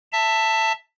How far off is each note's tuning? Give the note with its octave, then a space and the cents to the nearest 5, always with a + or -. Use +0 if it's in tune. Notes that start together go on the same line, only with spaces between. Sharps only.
E5 +0 A5 +15